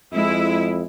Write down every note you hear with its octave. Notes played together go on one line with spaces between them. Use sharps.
F2 G#3 E4